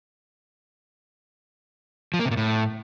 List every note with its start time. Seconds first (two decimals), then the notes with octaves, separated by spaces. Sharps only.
2.14 F3
2.19 A#3
2.25 C3
2.31 A#2
2.37 A2